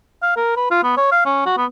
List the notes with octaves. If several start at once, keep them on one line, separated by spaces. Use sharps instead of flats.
F5
A#4
B4
F4
B3
C#5
F5
C#4
F#4
B3